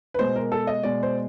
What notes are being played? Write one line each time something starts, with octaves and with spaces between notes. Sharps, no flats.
B4
B2 G#3 C5
A#4
A4
D#5
B2 G#3 D5
C5